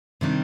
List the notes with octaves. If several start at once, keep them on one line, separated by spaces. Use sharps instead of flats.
C3 D#3 G3 D4